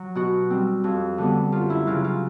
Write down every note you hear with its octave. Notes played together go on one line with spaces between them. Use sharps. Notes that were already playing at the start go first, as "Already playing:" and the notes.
Already playing: F#3
B2 F#4
G3 C4
F2
D3 G3 B3
F#2 F4
E4
C#3 F#3 F4
F4